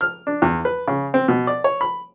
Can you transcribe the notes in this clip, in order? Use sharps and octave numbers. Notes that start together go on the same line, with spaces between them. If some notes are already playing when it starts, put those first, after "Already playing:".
F6
D4
E2
B4
C#3
C4
B2
D5
C#5
B5